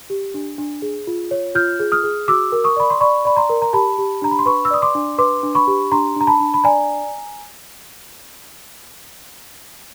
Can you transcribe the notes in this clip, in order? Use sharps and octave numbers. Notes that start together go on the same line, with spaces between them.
G4
D4
D4
G#4
F4
C#5
F4 F6 G6
G#4
D#6 F6
G#4
F#4 D6 E6
A#4
C#6 D#6
D5 B5
C6
D5 B5 C#6
D5 B5
A#5 C6
A#4
A#5
G4 A5 B5
G4
D4 A#5
B5
C6
B4 B5 C#6
E6
D5 D#6
C6 D6
D4
B4 C6 D6
D4
B5 C#6
G4
D4 A#5 C6
D4 A#5
A5 B5
D4
B5
D5 G#5 A#5